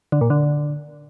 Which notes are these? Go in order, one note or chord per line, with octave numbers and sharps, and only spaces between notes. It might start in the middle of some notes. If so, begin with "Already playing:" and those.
D3
A#2
D3